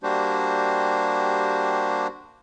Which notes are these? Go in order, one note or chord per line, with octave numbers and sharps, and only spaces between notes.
G3 A#3 D4 F#4 G4 C5